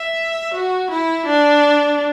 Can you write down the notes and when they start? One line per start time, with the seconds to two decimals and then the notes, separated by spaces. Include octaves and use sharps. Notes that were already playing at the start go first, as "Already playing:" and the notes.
Already playing: E5
0.54 F#4
0.91 E4
1.26 D4